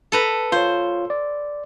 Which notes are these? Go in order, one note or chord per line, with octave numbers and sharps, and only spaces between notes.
A4 B4 A#5
F4 C5 C#5
D5